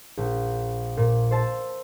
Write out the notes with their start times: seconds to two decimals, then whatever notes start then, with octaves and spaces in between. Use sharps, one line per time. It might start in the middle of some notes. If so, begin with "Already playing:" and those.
0.17 A#1
0.97 A#2
1.31 C5 E5 A5